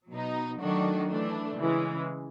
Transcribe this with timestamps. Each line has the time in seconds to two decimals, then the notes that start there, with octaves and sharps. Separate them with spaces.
0.09 B2 F#3 B3 D#4
0.59 D#3 F#3 A3 D4 F#4
1.08 E3 A3 D4
1.58 C#3 E3 G#3